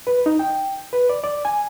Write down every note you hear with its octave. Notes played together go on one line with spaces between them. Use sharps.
B4
D#4
G5
B4
D5
D5
G#5